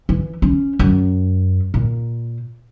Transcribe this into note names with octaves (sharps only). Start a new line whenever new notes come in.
E3
C#4
F#2
A#2